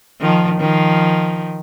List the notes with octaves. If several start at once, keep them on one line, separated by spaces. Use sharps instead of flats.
D#3 F3
D#3 F3